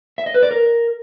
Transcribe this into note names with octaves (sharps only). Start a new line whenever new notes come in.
E5
D#5
B4
D5
A#4